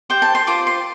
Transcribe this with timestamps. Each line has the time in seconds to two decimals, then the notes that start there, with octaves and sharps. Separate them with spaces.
0.10 G4 C5 G5
0.22 A5
0.35 C6
0.47 F4 C5 D6
0.67 C6